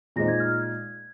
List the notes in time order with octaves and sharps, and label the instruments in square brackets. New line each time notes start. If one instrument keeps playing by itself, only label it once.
[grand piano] A#2 G#3 D#4 C5 [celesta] A#6
[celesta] G#6
F6
G#6